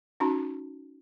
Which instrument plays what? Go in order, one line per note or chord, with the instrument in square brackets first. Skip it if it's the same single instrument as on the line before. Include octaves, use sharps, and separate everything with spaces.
[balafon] C#4 D#4 F#4 A5